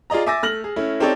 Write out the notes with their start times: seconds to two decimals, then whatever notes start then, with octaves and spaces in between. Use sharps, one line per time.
0.10 F4 G#4 D5 D#5 A#5
0.26 E5 G#5 D6 E6 A6 A#6
0.43 A3 F6 A#6 F#7
0.64 G#4
0.76 A3 C#4 E4
1.00 C4 D#4 G4 A4 C#5 D5